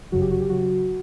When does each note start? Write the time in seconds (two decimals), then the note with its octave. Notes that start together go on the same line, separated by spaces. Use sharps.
0.12 G1 F#2 C#3 F#3 F#4
0.21 G4
0.31 F#4
0.41 G4
0.49 C#3 F#3 F#4